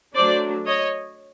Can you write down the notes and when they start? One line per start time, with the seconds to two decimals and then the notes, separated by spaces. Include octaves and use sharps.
0.15 F#3 A3 D4 C5 D5
0.65 C#5 D#5